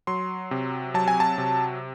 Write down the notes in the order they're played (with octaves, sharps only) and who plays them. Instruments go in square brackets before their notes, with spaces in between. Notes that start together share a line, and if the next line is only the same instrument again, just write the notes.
[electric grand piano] F#3 C6
C3
F#3 A5
G#5
A5
C3